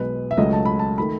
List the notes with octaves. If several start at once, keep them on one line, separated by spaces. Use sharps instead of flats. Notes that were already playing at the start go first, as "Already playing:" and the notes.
Already playing: B1 B2 G#3 B4
E5
C#2 C#3 F#3 A3 D#5
A5
B5
A5
D#3 A3 B5